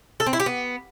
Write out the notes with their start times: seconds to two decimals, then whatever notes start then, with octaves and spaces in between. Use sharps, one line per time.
0.20 A4
0.26 C4
0.33 E4
0.40 G4
0.46 B3